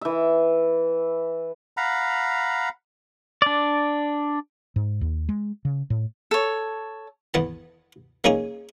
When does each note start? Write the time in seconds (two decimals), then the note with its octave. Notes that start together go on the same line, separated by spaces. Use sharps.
0.01 E3 E5
1.77 F5 F#5 A#5 B5
3.42 D4 D5
4.76 G#2
5.01 D#2
5.29 G#3
5.65 C#3
5.90 A2
6.31 A4 C#5
7.34 E2 B3 A5
8.24 A#3 C#4 D#4 G#4 C#5